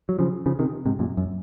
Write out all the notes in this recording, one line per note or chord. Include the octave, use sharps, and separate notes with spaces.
F#3
C#3 F3
C#3 F3
C3 D#3
G#2 C3
F#2 A#2
F#2